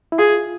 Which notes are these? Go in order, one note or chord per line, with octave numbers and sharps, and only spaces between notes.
E4
F4 G#4